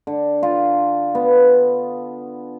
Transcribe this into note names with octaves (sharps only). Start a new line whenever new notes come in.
D3
F4
B3